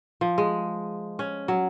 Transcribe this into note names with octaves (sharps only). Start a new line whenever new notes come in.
F3
G#3
C#4
F#3